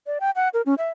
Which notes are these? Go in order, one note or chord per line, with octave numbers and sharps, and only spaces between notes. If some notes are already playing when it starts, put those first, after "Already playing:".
D5
G5
F#5
A#4
C#4
E5